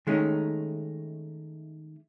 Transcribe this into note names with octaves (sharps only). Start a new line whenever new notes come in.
D#3 G#3 A3 C#4 D#4